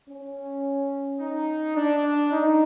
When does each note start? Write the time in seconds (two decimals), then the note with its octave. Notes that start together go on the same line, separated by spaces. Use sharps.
0.09 C#4
1.20 D#4
1.76 D4
2.32 D#4